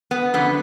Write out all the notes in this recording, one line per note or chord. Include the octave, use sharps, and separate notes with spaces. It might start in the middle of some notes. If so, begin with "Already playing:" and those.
B3
F#2 D3 F3 B3